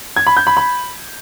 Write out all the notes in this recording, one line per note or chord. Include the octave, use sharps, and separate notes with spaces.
G#6
B5
G6
B5
B5